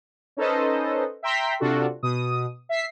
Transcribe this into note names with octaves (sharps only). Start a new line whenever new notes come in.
C#4 D#4 A4 B4 C5 D#5
E5 G5 A#5 C6 B6
C3 D4 F4 F#4 A4
B2 D#6
E5 B6 C7